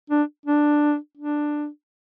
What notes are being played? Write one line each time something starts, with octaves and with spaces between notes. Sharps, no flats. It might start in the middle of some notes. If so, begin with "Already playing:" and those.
D4
D4
D4